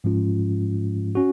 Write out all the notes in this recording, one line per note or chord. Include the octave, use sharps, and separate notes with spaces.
G#2 F3 G#3 C#4 F4
C#4 F#4